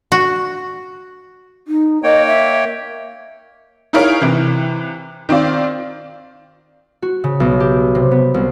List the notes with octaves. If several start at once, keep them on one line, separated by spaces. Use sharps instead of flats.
F#4
D#4
A#3 C#5 D#5 G5
E5
D#4 E4 G#4 A#4 C#5 F5
C3 E3
D#3 C4 F4 D5
F#4
C#3
B1
G4
C3
B3
C2